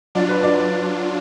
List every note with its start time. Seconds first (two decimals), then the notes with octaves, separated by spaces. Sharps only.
0.15 F#3 D4 F4 D5
0.29 B4
0.43 D5